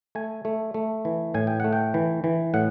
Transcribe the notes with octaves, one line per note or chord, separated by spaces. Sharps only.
A3 G#5
A3
A3
E3
A2 G#5
G5
A3 F#5
G5
E3
E3
A2 F#5